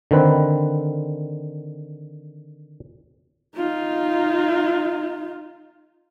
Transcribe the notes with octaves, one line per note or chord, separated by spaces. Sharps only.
D3 D#3 C4 B4
D#4 F4